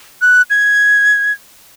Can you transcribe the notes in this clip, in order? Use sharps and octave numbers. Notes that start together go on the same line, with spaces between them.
F#6
G#6